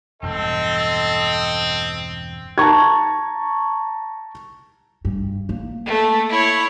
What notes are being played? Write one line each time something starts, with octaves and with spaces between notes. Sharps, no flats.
E1 G2 C4 A4 D#5
A5 A#5 C#6 G#6
G2
A#3
A3
E4 C#5